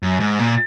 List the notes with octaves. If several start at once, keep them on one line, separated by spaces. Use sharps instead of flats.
F#2
G#2
A#2